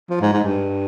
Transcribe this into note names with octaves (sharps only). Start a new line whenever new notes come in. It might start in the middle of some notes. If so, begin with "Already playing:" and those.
F3
G#2
G#2
G2